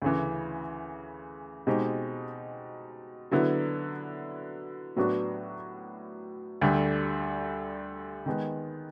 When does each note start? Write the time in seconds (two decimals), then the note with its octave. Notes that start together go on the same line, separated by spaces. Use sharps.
0.02 D2 C#3 E3
1.67 B2 G#3 C4 D#4 G4
3.31 D3 F#3 B3 E4
4.97 A2 F#3 B3 D4 F#4
6.61 D2 D3 G3
8.26 D#3 G#3 B3